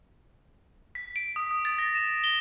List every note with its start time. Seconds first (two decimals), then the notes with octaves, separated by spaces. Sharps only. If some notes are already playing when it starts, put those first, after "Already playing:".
0.95 B6
1.16 D7
1.36 D#6
1.51 D#6
1.65 A6
1.78 A#6
1.95 E7
2.24 G7